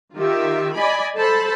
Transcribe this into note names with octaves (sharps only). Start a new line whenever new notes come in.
D#3 F4 G4 E5
D5 D#5 G#5 B5
A4 C5 A5 B5